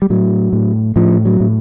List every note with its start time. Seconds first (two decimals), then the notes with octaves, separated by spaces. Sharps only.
0.02 G3
0.10 A2 F#3
0.53 A2
0.96 A2 F3
1.25 F#3
1.40 A2